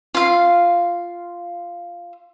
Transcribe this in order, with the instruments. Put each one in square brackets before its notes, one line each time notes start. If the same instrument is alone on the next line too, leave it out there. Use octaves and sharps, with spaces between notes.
[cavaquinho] F4 F5